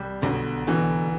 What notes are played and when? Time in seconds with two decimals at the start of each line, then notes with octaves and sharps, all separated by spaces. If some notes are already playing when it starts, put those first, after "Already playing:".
Already playing: C2 G3
0.22 B1 B2 D3
0.67 B2 D3 E3